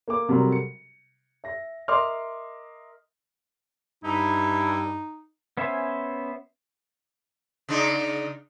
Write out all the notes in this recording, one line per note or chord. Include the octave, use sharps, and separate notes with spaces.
A#3 D6
C3 F#3 G3 A3 A#4
C#7
E5 A#6
A#4 D#5 E5 C6 D6 F6
G2 D#4 E4
B3 C#4 C5 E5 G#5
C#3 D4 D#4